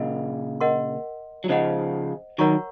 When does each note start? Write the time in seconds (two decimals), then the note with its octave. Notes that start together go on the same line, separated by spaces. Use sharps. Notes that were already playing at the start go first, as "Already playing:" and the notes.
Already playing: A#2 C#3 A#4 D#5 F#5
0.61 A#4 D#5 F#5 C6
1.44 F#3
1.49 C#3 F3 C5 D#5 F#5
2.38 D#3 F#3 A#4 C#5 F#5 A#5 C#6